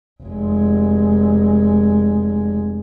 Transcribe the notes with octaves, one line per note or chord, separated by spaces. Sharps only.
F1 G#3